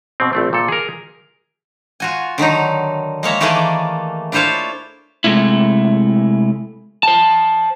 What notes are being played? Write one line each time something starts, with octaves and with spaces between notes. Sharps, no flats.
B2 C4
A#1 A3 C4
A#2 A4
G#4 A#4
F4 F#4 G#5
D3 D#3 F#3 D#4
G#3 A#3 C#5 E5
D#3 E3 A3 A#3 G#4 D5
D4 E4 F4 C5 C#5 F5
C3 E3 G#3 A3 E4
C5 A5